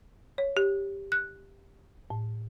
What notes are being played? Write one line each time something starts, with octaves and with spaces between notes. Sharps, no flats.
C#5
G4
F#6
A2